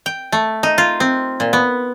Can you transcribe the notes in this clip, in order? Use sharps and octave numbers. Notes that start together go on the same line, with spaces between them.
G5
A3
D#4
F4
C4
A#2
B3